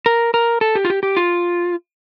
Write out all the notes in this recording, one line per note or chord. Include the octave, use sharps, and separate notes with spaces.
A#4
A#4
A4
G4
F4
G4
G4
F4